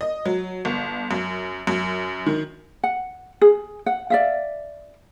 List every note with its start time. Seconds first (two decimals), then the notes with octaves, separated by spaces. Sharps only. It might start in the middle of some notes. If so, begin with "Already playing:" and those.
0.01 D#5
0.26 F#3
0.65 G1
1.11 F#2
1.67 F#2
2.26 D#3
2.83 F#5
3.41 G#4
3.86 F#5
4.10 D5 E5 F5